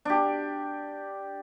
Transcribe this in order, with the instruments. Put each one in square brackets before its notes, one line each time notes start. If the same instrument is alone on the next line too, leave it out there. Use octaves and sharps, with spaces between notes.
[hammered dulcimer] D4 G4